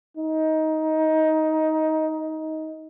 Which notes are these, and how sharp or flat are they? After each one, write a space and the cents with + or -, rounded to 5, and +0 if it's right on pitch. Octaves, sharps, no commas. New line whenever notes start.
D#4 +15